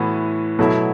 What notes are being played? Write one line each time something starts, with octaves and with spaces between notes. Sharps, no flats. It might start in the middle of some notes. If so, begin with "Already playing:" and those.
Already playing: A2 E3 B3 F#4
B2 F#3 A3 E4